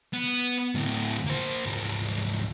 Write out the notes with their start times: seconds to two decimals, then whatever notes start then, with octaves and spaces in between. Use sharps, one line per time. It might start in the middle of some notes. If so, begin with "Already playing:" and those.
0.13 B3
0.75 D2 A2
1.26 A#3 C5
1.66 D2 G#2